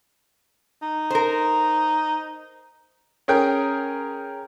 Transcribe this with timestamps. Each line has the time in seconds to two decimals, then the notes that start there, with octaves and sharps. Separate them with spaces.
0.82 D#4
1.10 A#4 C5
3.28 C#4 G#4 A#4 G5